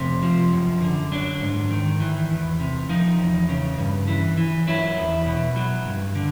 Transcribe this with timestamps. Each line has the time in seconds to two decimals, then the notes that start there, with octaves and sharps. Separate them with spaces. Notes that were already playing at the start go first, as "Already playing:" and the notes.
Already playing: F2 C3
0.23 F3
0.52 F#2
0.82 D3
1.12 F#3 D4
1.42 G#2
1.71 D#3
2.00 E3
2.30 E2
2.60 C3
2.89 F3 D#4
3.19 E2
3.49 C#3
3.78 G2
4.08 E3
4.38 E3
4.67 F#3 E4
4.97 E2
5.26 B2
5.56 F#3
5.86 G2
6.15 D3